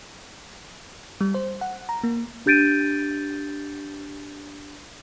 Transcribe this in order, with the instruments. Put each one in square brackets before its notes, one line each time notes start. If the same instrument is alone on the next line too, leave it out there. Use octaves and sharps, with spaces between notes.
[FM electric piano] G3
C5
F#5
A#5
A#3
[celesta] D4 G4 G6 A6 D7 D#7